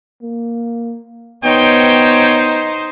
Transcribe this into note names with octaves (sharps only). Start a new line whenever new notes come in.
A#3
B3 D#4 C5 C#5 G5